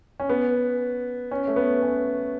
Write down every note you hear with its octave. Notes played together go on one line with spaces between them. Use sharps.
C#4
B3
C#4
A3
B3
C#4